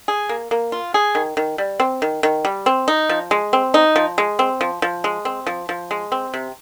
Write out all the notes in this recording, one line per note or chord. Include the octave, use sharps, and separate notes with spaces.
G#4
A#3
A#3
F4
G#4
D#3
D#3
G3
C4
D#3
D#3
G3
C4
D#4
F3
G#3
C4
D#4
F3
G#3
C4
F3
F3
G#3
C4
F3
F3
G#3
C4
C3